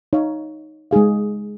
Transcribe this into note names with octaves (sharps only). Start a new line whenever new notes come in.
D#4 C#5 F5
G#3 D#4 G#4 F5